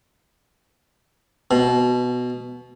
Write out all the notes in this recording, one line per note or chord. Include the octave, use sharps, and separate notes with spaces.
B2